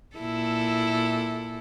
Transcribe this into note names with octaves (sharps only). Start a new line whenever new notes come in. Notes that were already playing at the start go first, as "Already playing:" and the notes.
A#2 E4 A4